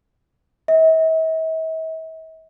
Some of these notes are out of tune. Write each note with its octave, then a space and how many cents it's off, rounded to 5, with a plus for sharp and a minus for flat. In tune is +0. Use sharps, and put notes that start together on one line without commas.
E5 -45